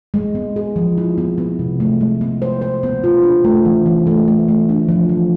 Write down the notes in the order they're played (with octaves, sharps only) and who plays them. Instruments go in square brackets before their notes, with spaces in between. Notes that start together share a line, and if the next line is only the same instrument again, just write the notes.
[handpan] G#3
B3
G#4
F3
E4
B3
B3
C3
A3
G#3
B3
C5
C5
B3
F4
D4
A3
E3
E3
A3
A3
A3
D4
F3
F3